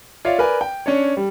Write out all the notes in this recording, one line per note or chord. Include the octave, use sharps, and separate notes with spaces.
F4 C#5 D5 E5 F5
A#4 B4 D5 G#5
G5
C#4 D4 C#5
G3